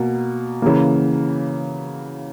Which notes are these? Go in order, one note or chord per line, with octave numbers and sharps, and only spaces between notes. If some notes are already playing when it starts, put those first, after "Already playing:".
Already playing: B2 A#3
C#3 E3 A#3